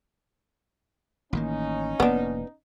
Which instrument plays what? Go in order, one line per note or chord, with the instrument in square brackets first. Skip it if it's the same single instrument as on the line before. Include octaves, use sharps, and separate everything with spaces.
[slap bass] A1 D#3 A#3 [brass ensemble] C#4 D#4
[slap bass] F1 G#2 A#3 [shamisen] B3 D4